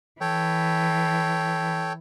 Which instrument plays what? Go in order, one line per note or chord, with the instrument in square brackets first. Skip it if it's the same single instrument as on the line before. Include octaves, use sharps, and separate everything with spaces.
[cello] E3 [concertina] A4 C#5 G5